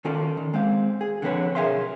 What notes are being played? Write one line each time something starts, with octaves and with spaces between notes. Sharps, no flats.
D#3 C#4 F4 A4 D5
D#3
G#3 C4 F5
G#4
D3 F3 C4 B4 C#5
B1 G#4 A#4 E5 F5 C6